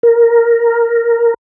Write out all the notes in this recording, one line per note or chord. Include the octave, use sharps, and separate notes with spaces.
A#4